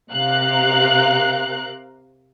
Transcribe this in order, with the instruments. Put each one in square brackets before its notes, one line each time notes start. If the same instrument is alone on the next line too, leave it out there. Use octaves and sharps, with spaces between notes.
[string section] C3 A#4 F5 F#6